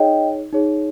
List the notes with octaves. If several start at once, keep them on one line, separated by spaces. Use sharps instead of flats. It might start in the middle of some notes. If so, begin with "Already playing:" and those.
Already playing: D#4 G#4 C#5 D#5 G5
D#4 G#4 C#5